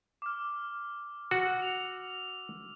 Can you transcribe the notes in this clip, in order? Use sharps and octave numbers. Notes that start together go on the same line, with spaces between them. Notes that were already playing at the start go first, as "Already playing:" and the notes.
D6 F6
F#4 E6
F7